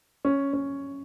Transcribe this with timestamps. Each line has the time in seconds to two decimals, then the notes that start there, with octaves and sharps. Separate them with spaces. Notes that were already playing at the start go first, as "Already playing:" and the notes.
0.25 C#4
0.53 C#4